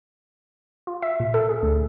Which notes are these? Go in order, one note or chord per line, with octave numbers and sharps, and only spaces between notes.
F4
E5
A#2
A4
G#4
D2